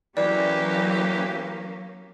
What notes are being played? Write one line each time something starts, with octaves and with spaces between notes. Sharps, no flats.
E3 F#3 A#3 C#4 G4 D5